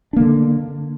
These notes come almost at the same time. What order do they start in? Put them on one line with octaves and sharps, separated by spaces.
D4 A#3 D3